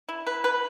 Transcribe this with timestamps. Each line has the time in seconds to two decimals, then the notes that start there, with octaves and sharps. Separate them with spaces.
0.09 E4
0.27 B4
0.44 B4